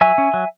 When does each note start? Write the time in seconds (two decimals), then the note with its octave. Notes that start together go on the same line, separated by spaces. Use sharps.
0.01 F#3 E5 G#5
0.18 C#4
0.34 F#3